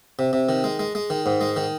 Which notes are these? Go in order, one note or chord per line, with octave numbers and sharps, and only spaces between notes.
C3
C3
D#3
G#3
G#3
G#3
D#3
G#2
G#3
D#3